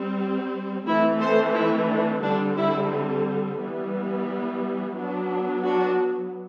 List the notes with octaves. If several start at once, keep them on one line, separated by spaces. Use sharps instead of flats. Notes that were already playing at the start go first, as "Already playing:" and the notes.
Already playing: G3 C4
E3 A3 C4 E4
A4 C5
E4
D4
D3 G3 C4 D4
E4
E3 G3 B3
F#3 B3 D4
D4 F#4